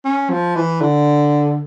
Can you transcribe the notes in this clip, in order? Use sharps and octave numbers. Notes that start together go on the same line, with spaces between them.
C#4
F3
E3
D3